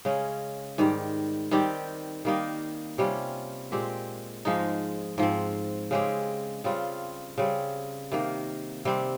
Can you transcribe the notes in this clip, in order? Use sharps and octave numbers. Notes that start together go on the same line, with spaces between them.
C#3 G#3 C#4
G#2 D#3 G3
D#3 G3 C4 G4
D#3 G3 A#3 D#4
C3 G3 C#4 F4
A#2 G#3 C4 G4
G#2 F3 G#3 D#4
G#2 F3 C4
C#3 G#3 C4 G4
C#3 G3 C4 F4
C#3 G3 C4
C3 D#3 A#3
C3 G3 C4